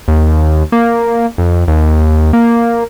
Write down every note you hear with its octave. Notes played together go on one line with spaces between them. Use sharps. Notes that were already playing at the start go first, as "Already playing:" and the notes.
D#2
A#3
F2
D#2
A#3